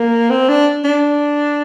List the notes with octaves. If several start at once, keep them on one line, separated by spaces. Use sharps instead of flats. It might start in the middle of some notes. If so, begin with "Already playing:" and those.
Already playing: A#3
C4
D4
D4